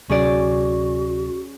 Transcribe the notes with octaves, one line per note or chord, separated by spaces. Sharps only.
D2 C3 F#3 C#4 F#4 G#4 D5